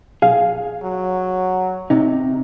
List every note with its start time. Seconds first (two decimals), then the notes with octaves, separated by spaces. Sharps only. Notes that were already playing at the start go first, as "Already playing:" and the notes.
0.22 B1 G#4 F5
0.83 F#3
1.90 C3 D#4